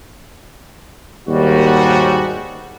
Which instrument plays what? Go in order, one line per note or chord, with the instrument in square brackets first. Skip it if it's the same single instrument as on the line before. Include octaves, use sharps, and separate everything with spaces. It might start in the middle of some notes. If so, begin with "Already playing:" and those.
[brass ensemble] D#2 G#2 G3 F#4